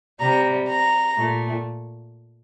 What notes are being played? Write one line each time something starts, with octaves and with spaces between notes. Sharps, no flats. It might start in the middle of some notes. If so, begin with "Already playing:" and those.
C3 G3 A#5
A#5
A#2 A3